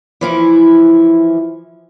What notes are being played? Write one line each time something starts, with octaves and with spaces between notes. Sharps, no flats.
E3 F3 E4